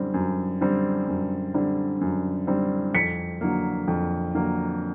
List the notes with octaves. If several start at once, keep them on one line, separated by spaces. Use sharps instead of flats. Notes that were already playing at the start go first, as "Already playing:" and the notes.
Already playing: F#2 D3 G3 C4
F#2
D3 G3 C4
F#2
D3 G3 C4
F#2
D3 G3 C4
F2 B6 C#7
D3 F#3 A#3
F2
D3 F#3 A#3